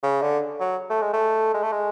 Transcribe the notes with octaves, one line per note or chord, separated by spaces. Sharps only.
C#3
D3
F#3
A3
G#3
A3
G#3
A3
G#3